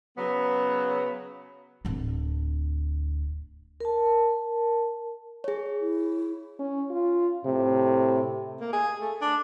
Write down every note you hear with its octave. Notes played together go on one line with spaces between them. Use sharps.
C#3 F#3 B3
D1 D4
A#4 A5
G#4 C#5
E4
C#4
F4
A2 C3
A#3
G#4
A3
D4